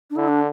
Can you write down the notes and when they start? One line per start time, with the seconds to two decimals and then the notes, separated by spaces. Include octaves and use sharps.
0.10 D4
0.16 D3 E4
0.28 D4